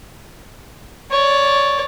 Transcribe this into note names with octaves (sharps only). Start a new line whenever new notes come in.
C#5 D5